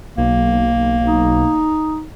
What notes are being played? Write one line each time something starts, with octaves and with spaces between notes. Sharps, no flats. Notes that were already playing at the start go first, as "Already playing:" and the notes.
B1 A#3
D#4